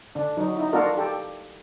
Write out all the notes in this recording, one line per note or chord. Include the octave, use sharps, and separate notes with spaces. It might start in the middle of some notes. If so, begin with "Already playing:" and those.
D3 D4
F#3 D#4
D#4 E4
A#3 D4 F4 F#4 A4 A#4
G4 A4